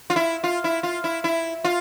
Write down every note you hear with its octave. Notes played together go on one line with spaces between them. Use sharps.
F4
E4
F4
E4
F4
E4
E4
F4